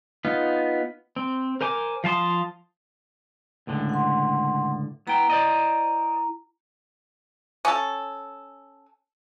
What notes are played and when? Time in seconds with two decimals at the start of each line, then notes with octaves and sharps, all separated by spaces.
0.25 B3 D#4 F4
1.16 C4
1.61 A#4 C5 G#5 D6
2.04 F3 F5 A5 C6 D#6
3.67 C#2 A2 D3
3.89 F#5 C6
5.07 B3 E4 G5 A#5
5.30 C5 D5 D#5
7.65 C#4 A4